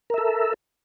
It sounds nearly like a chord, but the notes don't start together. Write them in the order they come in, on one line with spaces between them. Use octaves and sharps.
A#4 E5 A4